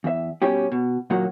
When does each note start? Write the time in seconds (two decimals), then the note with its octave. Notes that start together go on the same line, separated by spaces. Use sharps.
0.04 E2 E5
0.42 B2 G3 C#4 G4
0.72 B2
1.10 D#2 A#2 D#3 F#3 A#3 F#5